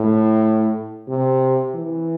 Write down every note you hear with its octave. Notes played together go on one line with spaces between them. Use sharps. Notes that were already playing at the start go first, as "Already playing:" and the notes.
Already playing: A2
C3
E3